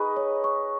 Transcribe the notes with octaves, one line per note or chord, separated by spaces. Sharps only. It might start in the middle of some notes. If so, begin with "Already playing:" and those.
Already playing: D#4 G#4 B4 G#5 C#6
C#5
C#6